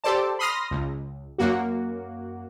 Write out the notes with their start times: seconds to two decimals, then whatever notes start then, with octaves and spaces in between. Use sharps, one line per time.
0.04 G4 A4 C5 D5 A5
0.39 B5 C6 D#6 F6 A#6
0.71 C#2
1.38 F#2 A#3 F#4